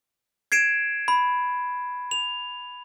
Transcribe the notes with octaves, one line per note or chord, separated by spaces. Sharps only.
G#6 C7 D7 E7
B5
F7